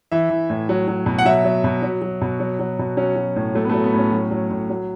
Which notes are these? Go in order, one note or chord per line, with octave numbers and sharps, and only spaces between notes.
E3 E5
E3
A2
F#3
F#3
B2
F#5
F#3 E5
F#3
B2
F#3
F#3
B2
F#3
F#3
B2
F#3 C#4
F#3
A2
F#3 A3
B3
A3
F#3
B3
A2 C#4
F#3
F#3
A2
F#3